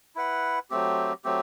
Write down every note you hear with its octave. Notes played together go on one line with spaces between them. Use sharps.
E4 B4 F#5
F#3 A3 C4 G4
F#3 A3 C4 G4